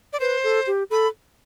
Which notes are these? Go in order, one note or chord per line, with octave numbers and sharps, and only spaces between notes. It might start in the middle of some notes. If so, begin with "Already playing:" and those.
D5
B4 C5
A4
G4
A4 B5